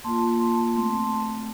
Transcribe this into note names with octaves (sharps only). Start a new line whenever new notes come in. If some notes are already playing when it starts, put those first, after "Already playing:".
A#3 F4 A5 C6
A5 C6
A3 C4 A5 C6